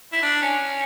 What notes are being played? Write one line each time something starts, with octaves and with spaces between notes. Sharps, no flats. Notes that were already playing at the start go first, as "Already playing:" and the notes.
E4
D4
C#4